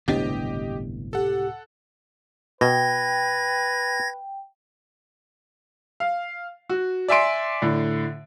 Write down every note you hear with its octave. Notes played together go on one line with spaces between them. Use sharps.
G1 C#2 A2 C3 B3 D4 G4 D#5
G4 A4 F#5
B2 B4 G5 G#6 A#6
F5
F#4
D5 E5 G#5 C6 D7
A2 D3